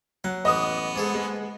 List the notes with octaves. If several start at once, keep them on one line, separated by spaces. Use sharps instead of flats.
F#3 F#5
A1 E3 B3 D#5 D#6
G#2 G#4 A4
G#3